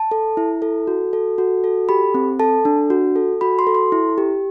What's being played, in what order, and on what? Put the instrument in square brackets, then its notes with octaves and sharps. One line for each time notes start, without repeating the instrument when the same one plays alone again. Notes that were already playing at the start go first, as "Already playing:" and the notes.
Already playing: [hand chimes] A5
A4
E4
A4
F#4
A4
F#4
A4
G4 B5
C4
A4 A5
D4
F#4
A4
F#4 B5
C6
A4
C6
E4
G4